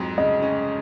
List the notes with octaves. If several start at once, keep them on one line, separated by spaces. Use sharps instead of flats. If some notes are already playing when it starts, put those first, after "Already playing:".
Already playing: F2 G#2 F#3
C#3 D#5
C#4